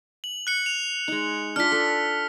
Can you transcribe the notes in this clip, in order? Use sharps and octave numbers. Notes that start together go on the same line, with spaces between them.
F#7
F#6 C#7 F#7
F7
G#3 D#4
D4 F4 F6 B6
A4